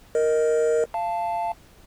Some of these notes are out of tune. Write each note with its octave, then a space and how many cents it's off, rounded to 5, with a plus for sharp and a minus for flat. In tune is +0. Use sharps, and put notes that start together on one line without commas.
A#4 +0 D#5 +0
F5 -20 A5 +0